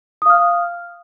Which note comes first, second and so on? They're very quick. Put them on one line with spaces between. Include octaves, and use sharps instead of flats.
D#6 F5 F6